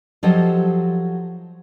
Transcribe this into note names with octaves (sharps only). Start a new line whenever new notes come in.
F3 F#3 G4 A4 C5 D#5